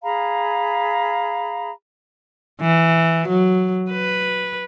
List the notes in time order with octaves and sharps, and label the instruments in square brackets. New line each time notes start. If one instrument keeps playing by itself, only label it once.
[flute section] G#4 F5 A#5 B5
[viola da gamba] E3
F#3
B4